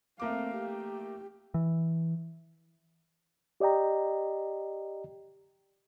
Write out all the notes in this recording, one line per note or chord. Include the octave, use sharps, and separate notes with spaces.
A3 A#3 C4 F5 D6
G4
E3
G4 D5 D#5 G5 A#5